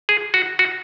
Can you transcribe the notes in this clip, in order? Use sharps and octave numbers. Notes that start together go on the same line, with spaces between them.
G#4
F#4
F#4